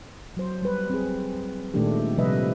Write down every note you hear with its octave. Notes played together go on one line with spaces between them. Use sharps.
F#3 C5
G3 B4
C4 G#4
A#2 D#3 G#3 A3 D4 G4
C3 F3 G3 B4 D#5 E5